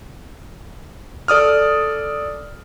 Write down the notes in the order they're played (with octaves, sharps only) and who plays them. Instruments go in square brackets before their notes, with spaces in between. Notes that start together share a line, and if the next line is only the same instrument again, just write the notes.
[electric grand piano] A4 D5 D#6 F6